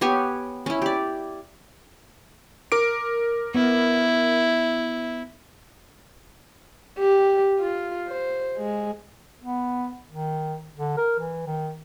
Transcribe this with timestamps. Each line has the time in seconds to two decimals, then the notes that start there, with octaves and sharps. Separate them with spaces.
0.01 B3 G4 C#5 G#5
0.66 C#4 E4
0.82 G4 D5
2.72 A#4 D6 D7
3.55 B3 E4
6.99 G4
7.59 F4
8.08 C5
8.57 G#3
9.41 B3
10.10 D#3
10.78 D3
10.97 A#4
11.20 E3
11.47 D#3